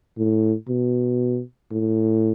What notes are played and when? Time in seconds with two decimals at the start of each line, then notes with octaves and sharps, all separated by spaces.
0.18 A2
0.68 B2
1.72 A2